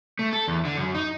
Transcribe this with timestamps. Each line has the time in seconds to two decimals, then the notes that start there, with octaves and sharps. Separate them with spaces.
0.19 A3
0.33 A4
0.48 E2
0.65 D3
0.78 F#2
0.94 D#4